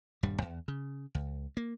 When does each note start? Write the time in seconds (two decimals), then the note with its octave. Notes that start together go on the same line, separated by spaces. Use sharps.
0.23 D#1 G2 G3
0.42 E2
0.68 C#3
1.15 C#2
1.57 A#3